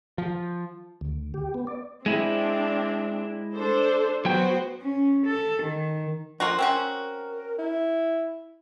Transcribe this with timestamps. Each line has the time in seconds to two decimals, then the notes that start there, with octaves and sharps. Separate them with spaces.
0.18 F3
1.01 D2
1.34 G4
1.54 B3
1.67 D5
2.06 G#3 C4 D4 E4
3.55 D4 A4 C5
4.25 F#3 B3 F#4 C5 G5
4.82 C#4
5.26 A4
5.63 D#3
6.40 F3 A#3 F4 F#4
6.59 C4 C#4 F#4 A#4
7.58 E4